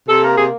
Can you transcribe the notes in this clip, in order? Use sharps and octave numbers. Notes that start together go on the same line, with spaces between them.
C3 A4
A#3 A#4
C3 G#4